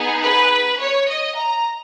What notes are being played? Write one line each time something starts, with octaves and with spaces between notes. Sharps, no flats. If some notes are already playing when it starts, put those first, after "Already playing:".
Already playing: B3 D#4 G#4
B4
C#5
D#5
A#5